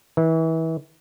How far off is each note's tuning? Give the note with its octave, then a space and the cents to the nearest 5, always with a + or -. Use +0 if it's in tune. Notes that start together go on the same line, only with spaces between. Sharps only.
E3 -30